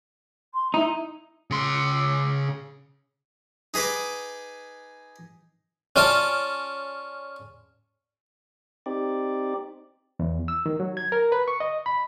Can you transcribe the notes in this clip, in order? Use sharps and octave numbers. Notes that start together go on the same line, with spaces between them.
C6
D#4 E4
C#3 C6
D#4 G#4 B4 D#5 D6
C#4 F4 D5 A5
C4 D#4 G4 D5
E2
E6
D#3
F#3
G#6
A#4
B4
C#6
D#5
B5